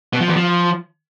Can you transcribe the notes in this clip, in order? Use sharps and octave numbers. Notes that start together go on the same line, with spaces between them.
B2
F3
E2
F3